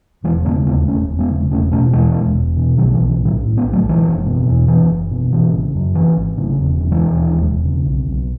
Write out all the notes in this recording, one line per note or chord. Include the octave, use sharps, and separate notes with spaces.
E1 E3 G#3
C#3 G#3 B3
D#2 G#3 B3
E1 A3 C#4
E1
G#3 B3
C#3
E1 A3 C#4
B2 A3 C#4
E2 E3 G#3
E1
E1
B2
B1 D#3 F#3
E3
B1
E3
A2
D#3 F#3
A2
G#3 B3
B1
F#3 A3
B1
E3 G#3
F#1
B2
E2
F#1 E3
F#1
B2
G#1 E3
C#3
F#2
G#1 E3
G#1
C#3
E1
C#3
E3 G#3
D#2
E1
E1
C#3
B1
B1